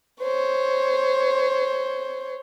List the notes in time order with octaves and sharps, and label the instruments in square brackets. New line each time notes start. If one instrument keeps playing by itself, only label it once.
[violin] C5 C#5